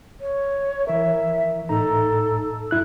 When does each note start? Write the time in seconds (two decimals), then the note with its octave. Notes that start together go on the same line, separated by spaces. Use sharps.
0.21 C#5
0.87 E3 A#4 E5
1.69 A2 D#4 A4 A#5
2.71 F#2 E4 F#6